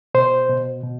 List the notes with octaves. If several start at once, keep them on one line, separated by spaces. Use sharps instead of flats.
B2 C5
B2
B2